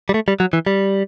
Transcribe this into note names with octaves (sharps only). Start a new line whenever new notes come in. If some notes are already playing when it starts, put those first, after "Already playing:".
G3
A3
G3
F#3
E3
G3